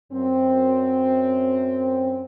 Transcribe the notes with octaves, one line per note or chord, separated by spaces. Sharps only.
F#2 C4